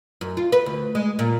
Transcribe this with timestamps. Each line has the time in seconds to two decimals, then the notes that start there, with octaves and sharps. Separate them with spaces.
0.21 F#2
0.37 F4
0.52 B4
0.66 D2
0.95 G#3
1.19 A#2